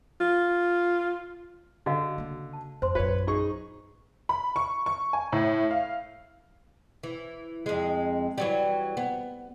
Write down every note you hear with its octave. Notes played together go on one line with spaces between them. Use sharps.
F4
D3 F#4 D#5 F5
C#3 A#3
A5
F2 C5 C6
A#1 F#2 F4 B4 C#5
D#4 G#4 C#6
B5
C#6
C#6
G#5
A2
F5
E3
F2 G#3
E3 F#3 G3
B3